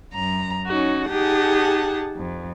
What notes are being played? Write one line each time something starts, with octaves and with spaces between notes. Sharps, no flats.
F#2 A#5
C#4 D#4 F#4
D#4 G4 G#4 F#5 A5
F2